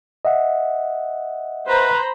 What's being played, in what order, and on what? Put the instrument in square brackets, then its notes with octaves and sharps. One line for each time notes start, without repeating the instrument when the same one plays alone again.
[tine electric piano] D#5 E5 F#5
[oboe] B4 [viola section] C5 A#5 B5